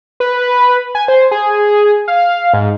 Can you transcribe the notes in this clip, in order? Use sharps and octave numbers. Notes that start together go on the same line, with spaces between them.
B4
G#5
C5
G#4
F5
G#2